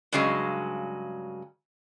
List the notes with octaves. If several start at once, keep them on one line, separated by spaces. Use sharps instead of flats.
G2 C#3 F#3 G#3